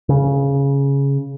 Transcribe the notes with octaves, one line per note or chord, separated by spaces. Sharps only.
C#3